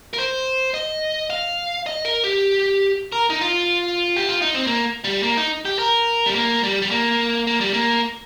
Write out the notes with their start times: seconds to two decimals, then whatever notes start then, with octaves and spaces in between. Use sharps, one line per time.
0.13 A#4
0.18 C5
0.74 D#5
1.30 F5
1.86 D#5
2.05 A#4
2.24 G4
3.12 A#4
3.30 D#4
3.41 F4
4.16 G4
4.29 F4
4.42 D#4
4.54 C4
4.67 A#3
5.04 G3
5.23 A#3
5.37 D#4
5.65 G4
5.79 A#4
6.26 G3
6.35 A#3
6.63 G3
6.82 G3
6.91 A#3
7.47 A#3
7.61 G3
7.74 A#3